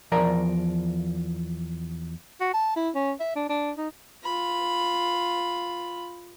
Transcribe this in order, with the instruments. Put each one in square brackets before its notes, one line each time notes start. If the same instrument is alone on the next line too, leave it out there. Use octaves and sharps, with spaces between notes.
[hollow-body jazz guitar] E2 F3 A#4 D5 A#5
[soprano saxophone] F#4
A5
E4
C#4
E5
D4
D4
D#4
[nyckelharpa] F4 B5